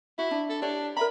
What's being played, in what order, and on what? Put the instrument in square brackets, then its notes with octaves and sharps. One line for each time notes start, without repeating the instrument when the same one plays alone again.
[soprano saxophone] E4 [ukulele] F#4
[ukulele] D4
[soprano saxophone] A4
[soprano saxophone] D4 [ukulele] G4 C#5
[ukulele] A#4 E5 A#5 [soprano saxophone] B5